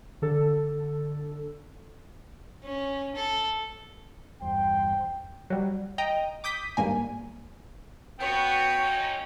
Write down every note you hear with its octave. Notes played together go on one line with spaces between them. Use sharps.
D3 A4
C#4
A4
E2 G2 C5 G5
F#3 G3
D#5 G5 A#5
D6 D#6 G6 B6
G#1 G2 A#3 G#5
B3 F#4 C#5 G5
A#2 C#4 D#4